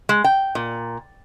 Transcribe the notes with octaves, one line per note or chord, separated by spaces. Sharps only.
G#3
G5
A#2